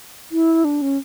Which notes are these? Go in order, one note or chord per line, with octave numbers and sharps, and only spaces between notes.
E4
D4
C#4